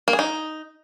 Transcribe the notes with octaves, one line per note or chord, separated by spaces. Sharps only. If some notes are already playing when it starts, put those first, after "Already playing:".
A#3
G#4
D#4